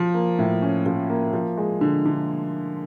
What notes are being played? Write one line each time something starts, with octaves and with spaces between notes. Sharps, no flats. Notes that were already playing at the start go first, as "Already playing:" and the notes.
Already playing: F3
A#3
A2
C#4
F3
A#3
F3
G#3
D3
D3